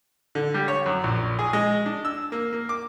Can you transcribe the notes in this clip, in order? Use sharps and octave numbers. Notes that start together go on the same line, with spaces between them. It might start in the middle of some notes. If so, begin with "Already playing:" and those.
D3
G3
C#5
F#2
A#1
G#4
G#3
D4
E6
A#3
A#3
D6